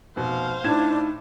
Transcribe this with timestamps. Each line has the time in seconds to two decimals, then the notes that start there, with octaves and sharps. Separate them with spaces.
0.16 F1 B2 C5 F5
0.64 A2 D4 D#4 G#6 E7